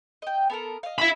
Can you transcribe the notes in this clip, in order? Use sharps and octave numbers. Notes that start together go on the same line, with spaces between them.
D#5 G5
B3 A4 A#4
D#5 F5
E5 B5